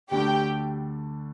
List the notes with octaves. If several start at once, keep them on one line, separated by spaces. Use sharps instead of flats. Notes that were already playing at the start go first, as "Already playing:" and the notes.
D2 D3 A3 D4 G4 A4 G5